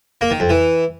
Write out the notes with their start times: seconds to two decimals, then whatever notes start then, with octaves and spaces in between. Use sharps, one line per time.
0.21 A#3
0.31 D#3
0.40 F2
0.49 E3